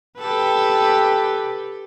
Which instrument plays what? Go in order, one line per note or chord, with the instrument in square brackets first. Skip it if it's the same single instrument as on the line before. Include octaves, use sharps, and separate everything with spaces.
[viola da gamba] G4 A4 B4